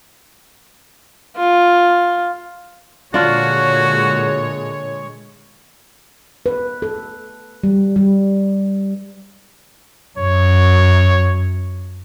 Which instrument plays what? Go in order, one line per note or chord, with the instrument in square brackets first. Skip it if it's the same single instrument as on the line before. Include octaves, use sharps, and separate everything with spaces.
[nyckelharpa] F4
[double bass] A#2 D3 [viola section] G#3 C#5 [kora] D4 F4 [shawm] F#4
[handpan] B4
A4
G3
G3
[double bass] F#2 [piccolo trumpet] C#5